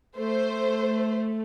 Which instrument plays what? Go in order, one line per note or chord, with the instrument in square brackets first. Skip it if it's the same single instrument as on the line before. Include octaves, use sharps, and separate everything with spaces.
[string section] A3 [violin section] C5